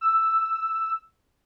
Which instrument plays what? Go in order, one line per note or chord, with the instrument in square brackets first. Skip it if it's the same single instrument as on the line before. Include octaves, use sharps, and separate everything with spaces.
[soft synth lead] E6